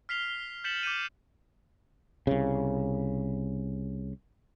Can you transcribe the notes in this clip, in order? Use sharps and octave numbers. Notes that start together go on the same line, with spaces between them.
F6 B6 C7 F7 G7
G6 A6 B6 C#7 E7 F#7
D6 G6 C#7 D#7
C2 C#3